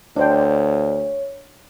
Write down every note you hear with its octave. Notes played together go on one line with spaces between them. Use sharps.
D2 D4 C5 C#5 G5